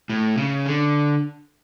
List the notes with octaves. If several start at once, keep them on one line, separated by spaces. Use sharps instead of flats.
A2
C#3
D3